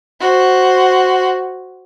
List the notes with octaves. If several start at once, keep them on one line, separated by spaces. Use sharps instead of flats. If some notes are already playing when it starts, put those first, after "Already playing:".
F#4 C5